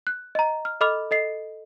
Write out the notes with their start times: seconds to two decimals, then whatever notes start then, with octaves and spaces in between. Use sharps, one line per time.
0.07 F#6
0.35 D#5 A#5
0.65 F6
0.81 A4 D#5 B5 D6 F6 F7
1.11 A4 D#5 C7